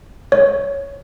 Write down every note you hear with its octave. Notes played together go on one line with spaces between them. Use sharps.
C#5